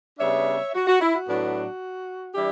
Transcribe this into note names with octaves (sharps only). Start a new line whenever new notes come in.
C#3 G3 B3 D4 C#5 E5
F#4
F#4
E4
F#4
A2 F#3 B3 D4
E3 G3 D4 E4 G4